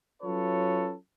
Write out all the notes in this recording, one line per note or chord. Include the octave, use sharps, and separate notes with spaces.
F#3 C#4 F4 A4 B4 C#5